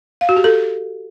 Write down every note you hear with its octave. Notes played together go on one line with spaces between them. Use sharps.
F5
F#4
G4
A4